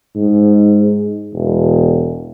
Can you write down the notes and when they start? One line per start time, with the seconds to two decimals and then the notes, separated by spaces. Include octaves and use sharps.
0.16 G#2
1.33 E1